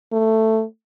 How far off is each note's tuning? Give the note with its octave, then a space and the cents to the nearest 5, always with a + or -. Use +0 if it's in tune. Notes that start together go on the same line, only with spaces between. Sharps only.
A3 +10